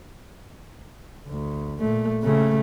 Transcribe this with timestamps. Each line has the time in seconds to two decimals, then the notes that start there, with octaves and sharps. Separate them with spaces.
1.28 D2
1.80 A#2 A3
2.23 C#3 A3